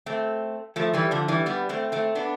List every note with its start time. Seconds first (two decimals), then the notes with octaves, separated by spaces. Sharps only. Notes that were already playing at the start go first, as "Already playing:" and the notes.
0.06 A3 C4
0.76 F3 A3
0.93 E3 G3
1.11 D3 F3
1.28 E3 G3
1.46 G3 B3
1.69 A3 C4
1.92 A3 C4
2.15 B3 D4